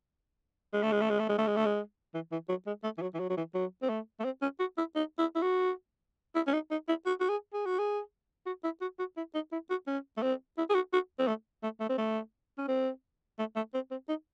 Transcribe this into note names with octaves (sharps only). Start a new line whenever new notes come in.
G#3
A3
G#3
A3
G#3
A3
G#3
A3
G#3
A3
G#3
E3
E3
F#3
G#3
A3
E3
F#3
E3
F#3
F#3
E3
F#3
C4
A3
A3
C4
C#4
F#4
E4
D#4
E4
E4
F#4
E4
C#4
D#4
D#4
E4
F#4
F#4
G#4
G#4
F#4
G#4
F#4
E4
F#4
F#4
E4
D#4
E4
F#4
C#4
A3
C4
E4
G#4
F#4
F#4
C4
A3
A3
A3
C4
A3
C#4
C4
A3
A3
C4
C4
D#4